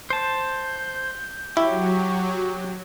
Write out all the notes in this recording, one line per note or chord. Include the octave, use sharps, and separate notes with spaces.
C5 A5 G6
F#3 E4 G4 C#6